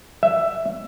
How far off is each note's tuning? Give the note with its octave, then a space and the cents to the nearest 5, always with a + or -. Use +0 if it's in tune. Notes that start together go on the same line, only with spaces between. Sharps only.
E5 +10